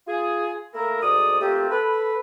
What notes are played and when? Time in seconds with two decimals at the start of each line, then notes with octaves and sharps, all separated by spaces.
0.07 F4 G#4
0.74 A3 A#3 E4 A#4
1.02 D2 G#2 D5 D#6
1.41 A3 A#3 C4 F4 G4
1.71 A4 B4